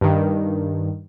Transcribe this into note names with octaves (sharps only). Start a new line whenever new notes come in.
G2 D#3